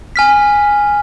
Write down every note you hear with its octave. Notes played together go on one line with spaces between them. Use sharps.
G#5 F6 B6